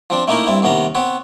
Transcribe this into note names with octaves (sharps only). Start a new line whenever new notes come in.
F3 C4 D4
A3 A#3 C#4 D#4 E4 A#4
G2 C4 E4
D#2 C3 B3 C#4 A#5
B3 C4 B4 C#5